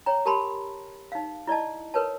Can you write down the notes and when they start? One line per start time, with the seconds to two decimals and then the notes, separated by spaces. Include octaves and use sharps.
0.06 C#5 G5 A#5
0.26 G4 A#4 A5 B5 C6
1.12 D#4 F5
1.47 E4 D5 D#5 A5
1.94 A#4 B4 C#5 A5